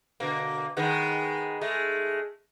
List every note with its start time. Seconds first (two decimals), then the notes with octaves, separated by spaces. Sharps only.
0.20 B2 D3 A#3
0.77 D#3 G#3 B3
1.61 G#3 A3